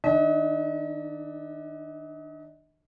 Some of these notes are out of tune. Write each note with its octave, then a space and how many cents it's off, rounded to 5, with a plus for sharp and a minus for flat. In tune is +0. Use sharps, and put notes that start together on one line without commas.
D#3 +0 D4 +25 D#5 +40